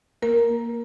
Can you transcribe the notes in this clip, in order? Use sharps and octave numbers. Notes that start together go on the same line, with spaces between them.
A#3 A#4